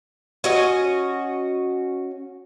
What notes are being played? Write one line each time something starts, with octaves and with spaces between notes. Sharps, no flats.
C#4 F#4 D#5